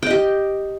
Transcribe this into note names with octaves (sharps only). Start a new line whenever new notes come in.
G4 D#5 G5